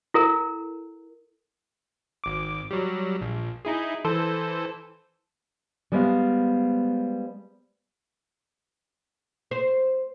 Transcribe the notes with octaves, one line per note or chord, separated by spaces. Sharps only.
E4 A4 A#4
G#1 D6
F#3 G3
A#1
D#4 E4 G#4
E3 A4 C5
G3 G#3 B3 C5 D#5 F5
C5